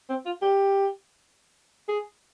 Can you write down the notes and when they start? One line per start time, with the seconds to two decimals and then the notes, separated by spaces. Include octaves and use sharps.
0.09 C4
0.26 F4
0.42 G4
1.88 G#4